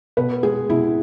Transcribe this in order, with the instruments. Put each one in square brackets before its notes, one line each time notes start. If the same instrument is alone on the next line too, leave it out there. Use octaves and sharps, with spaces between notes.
[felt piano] B2 B4
G#3 G#4
B2 E4